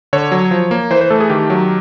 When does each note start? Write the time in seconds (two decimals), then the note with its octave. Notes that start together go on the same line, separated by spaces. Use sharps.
0.13 D3 C#5
0.32 F#3
0.51 F3
0.71 A#3
0.90 E3 C5
1.01 C5
1.10 A3 A4
1.20 G#4
1.30 D#3 G4
1.50 F#3